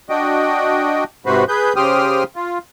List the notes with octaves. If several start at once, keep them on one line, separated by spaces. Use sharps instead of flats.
D4 F#4 D#5 G5
G#2 C3 F#4 B4 C5
G#4 B4 G6
C#3 G4 C5 G5 D#6 F6
F4